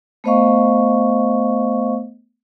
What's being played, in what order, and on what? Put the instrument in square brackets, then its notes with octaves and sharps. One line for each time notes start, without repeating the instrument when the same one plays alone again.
[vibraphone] A3 B3 C5 D#5 F5 C#6